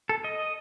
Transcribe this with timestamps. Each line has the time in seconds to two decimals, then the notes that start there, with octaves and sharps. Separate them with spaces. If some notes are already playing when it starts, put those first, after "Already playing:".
0.09 A4
0.24 D#5